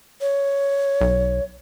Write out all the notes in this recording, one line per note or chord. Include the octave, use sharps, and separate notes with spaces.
C#5
B1